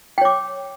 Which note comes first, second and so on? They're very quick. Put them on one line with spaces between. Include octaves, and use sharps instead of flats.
G5 C#5 D6